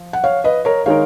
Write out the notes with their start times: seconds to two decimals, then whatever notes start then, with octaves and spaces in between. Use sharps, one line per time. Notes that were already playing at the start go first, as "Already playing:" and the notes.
Already playing: F3
0.13 F#5
0.24 C#5 F5
0.44 B4 D#5
0.65 A#4 C#5
0.86 D#3 G#3 D#4 A#4 C#5 F5